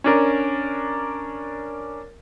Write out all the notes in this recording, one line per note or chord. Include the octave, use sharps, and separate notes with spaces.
C#4 D4 A#4